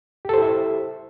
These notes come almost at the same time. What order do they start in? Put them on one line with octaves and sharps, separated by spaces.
G4 A4 C5 E4 E5